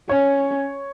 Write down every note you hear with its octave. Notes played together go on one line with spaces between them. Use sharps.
C#4 C#5